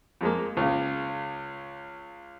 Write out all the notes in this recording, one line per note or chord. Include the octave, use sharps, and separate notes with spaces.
F2 G#3 A#3
C#2 C#3